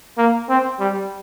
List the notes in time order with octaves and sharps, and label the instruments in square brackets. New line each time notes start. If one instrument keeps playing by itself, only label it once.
[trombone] A#3
C4
G3